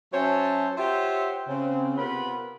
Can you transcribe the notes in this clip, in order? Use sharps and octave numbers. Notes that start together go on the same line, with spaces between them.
F#3 C#4 C5 C#5 E5 A5
F4 G4 C5 C#5 E5 F#5
C#3 C4
C3 B3 F4 A#4 B4 B5